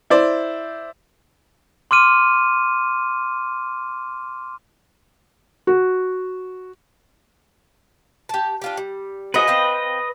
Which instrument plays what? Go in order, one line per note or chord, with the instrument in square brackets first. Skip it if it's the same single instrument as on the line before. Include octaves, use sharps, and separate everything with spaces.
[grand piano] E4 C5 D5
[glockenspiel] C6 D6 F6 D#7
[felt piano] F#4
[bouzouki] G4 A5
D4 F4 G4
G3
[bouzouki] F#4 G#4 C5 [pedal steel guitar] B4 D#5
[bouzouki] C4 F5 G5